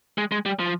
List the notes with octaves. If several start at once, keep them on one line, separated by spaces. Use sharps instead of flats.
G#3
G#3
G3
F3